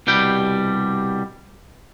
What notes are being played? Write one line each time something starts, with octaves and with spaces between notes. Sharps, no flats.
C2 B2 G3 G5